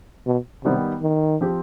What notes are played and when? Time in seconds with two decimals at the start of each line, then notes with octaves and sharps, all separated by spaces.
0.26 B2
0.64 C3 D#3 G3 B3 D#4
1.02 D#3
1.41 F3 C4 G4